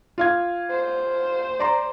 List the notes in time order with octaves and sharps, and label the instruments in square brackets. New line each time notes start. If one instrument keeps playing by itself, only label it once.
[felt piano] F4 F5 G#6
[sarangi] C5
[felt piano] D5 A#5 C6